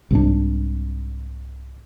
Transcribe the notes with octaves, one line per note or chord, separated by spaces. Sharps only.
C2 G#2 D4